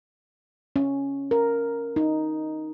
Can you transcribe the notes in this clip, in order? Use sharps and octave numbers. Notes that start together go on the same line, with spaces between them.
C#4
A#4
D#4